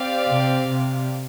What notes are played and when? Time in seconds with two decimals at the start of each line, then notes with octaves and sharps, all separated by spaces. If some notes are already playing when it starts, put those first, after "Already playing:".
Already playing: C4 G4 D5 F5
0.27 C3
0.67 C3